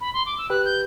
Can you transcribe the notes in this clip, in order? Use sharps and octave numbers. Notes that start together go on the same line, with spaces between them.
B5
C6
D6
E6
G4 B4 F#6
G6